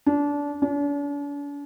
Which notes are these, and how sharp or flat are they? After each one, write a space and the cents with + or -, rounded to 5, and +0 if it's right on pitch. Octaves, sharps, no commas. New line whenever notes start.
D4 -25
D4 -45